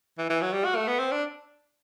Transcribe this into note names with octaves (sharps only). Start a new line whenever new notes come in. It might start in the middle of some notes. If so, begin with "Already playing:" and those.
E3
E3
F#3
G3
F#4
A3
B3
C4
D4